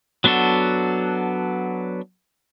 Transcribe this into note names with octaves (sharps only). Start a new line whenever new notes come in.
F#3 B3 D4 F#4 A4